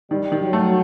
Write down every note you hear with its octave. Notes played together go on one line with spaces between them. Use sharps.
D#3 G3
D#3
F#3
A3